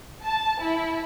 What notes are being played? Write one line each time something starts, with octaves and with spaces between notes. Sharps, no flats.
A5
E4